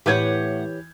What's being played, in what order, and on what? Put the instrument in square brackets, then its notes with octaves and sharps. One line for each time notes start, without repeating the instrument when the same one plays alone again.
[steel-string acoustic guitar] A2 F#5 [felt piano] E3 G6 G#6 [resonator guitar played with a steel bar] G4 B4 C#5